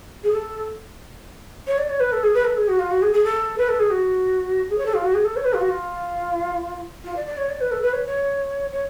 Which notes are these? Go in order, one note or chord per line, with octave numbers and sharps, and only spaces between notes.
G#4
A4
C#5
D5
C#5
B4
A4
G#4
B4
A4
G#4
F#4
F4
F#4
G#4
G#4
A4
B4
A4
G#4
F#4
G#4
C#5
A4
F4
F#4
G#4
A4
C#5
B4
F4
F#4
F4
F4
D5
D5
C#5
D5
B4
A4
B4
C#5
C#5
C#5